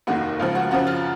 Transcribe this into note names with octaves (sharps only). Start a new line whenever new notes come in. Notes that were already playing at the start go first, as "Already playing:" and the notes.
F1 D#2 D#3 F#4
C#2 C#3 F3 F4
F#4
F#2 C#3 F3 F#4
F4